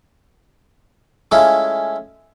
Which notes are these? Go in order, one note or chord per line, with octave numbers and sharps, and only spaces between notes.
G#3 A3 C#4 E4 F4